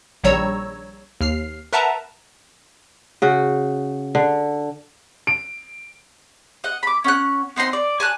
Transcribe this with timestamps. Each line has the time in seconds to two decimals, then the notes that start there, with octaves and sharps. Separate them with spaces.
0.23 A#1 D#3 G3 C#5 A#5 E6
1.21 D#2 F6 C7
1.73 A#4 B4 E5 F#5 A5 A#5
3.22 C#3 F#4
4.15 D3
5.27 D7
6.64 D#5 F#5
6.83 B5 D6
7.04 C#4 F#5 F#6
7.56 B3 C4 D#4 C6
7.73 D5
8.00 G#5 A5 F#6